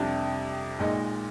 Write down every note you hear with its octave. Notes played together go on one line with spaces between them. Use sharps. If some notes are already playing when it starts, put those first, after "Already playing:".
Already playing: F2 C3 G3 D4
A#1 A#2 G#3 D#4